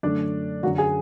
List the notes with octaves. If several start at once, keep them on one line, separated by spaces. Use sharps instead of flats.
F#2 D3 A3 D4 D5
F#2 D3 F#3 F#4 F#5
G#4 G#5